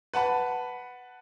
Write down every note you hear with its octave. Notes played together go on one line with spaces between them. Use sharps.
B4 F#5 A5 B5